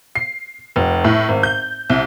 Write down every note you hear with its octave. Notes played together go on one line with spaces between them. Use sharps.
C7
F1
A2
G#1
G6
C2